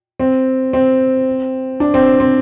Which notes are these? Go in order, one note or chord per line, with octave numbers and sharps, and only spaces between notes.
C4
C4
D4
C4
C4